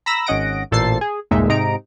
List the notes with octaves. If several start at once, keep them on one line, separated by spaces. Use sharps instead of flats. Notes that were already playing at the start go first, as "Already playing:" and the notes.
A#5 B5 E6 A#6
G#1 C#4 D#5 F#5 A#6 D7
A1 A#2 A4 C5 A6 C7
G#4
G1 D#2 A#2 G#3 D#4 E5
G#2 C3 D#4 A#5 D7